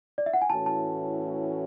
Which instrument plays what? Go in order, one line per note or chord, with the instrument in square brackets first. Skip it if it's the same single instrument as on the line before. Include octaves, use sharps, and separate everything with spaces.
[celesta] D5
E5
F#5
G#5
[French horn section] A2 E3 A3 C#4 F#4 [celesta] A5
[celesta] A5